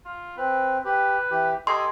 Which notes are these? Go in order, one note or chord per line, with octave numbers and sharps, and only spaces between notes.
F4
C4 B4
G4 B4
E3 G4
G4 A4 D#5 G#5 C6